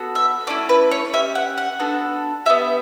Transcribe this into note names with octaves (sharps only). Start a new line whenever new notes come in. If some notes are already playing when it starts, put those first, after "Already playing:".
Already playing: B3 F#4 A4
E5
A3 C#4 E4 D5
B4
C#5
C#4 G4 E5
F#5
F#5
B3 D4 F#4 A4
B3 E4 G4 E5